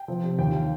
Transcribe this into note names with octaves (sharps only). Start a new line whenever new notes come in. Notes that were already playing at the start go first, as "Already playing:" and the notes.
Already playing: G5
F3
C3
D#2 G5
F5